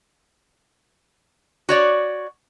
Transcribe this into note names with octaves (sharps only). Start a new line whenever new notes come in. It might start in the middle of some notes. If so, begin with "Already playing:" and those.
F#4 C#5 D5